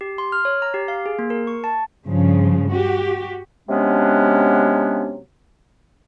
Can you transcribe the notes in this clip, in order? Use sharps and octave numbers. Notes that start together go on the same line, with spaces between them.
G4
C6
F6
C#5
A#5
G4
F5
G#4
A#3
A#4
C#6
A5
G2 C#3 F3
F#4 G4
C3 F#3 G#3 B3 C#4 D4